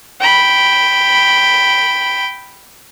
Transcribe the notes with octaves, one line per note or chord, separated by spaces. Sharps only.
G5 B5